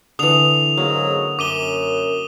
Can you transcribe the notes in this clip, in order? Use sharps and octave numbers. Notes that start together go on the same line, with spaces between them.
D3 E3 D#6 F7
G#2 C#3 F#3 A#3
F#2 D6 D#7 G7